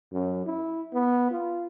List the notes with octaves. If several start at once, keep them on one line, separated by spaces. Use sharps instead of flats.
F#2
E4
B3
F4